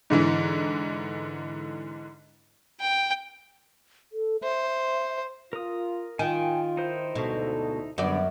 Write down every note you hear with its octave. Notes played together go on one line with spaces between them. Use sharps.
G#2 D3 E3
G5
A4
C5 E5
F4 A#4 D#6
D#3 F4 G5 G#5
D#4 E4 C5
D2 G#2 B2 A4
F#2 D3 B3 D5